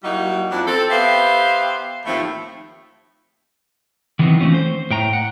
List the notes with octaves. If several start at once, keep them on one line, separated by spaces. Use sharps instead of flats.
F#3 G3 A#3 D#4 E4 F#4
F2 D4 E4
C4 A4
B3 G4 B4 C5 E5 F5
D#2 A2 F3 A3 C4
D#3 E3 F#3 B3 C4 D#4
E3 A3 C4 C#4 F4
C5
A2 G5 A#5
F#5